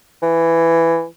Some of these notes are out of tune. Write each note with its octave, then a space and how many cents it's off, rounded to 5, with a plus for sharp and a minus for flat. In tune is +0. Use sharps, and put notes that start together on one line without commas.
E3 +10